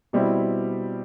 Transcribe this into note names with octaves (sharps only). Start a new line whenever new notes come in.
B2 G3 C4 E4